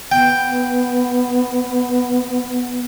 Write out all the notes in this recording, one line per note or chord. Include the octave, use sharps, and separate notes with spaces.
B3 G5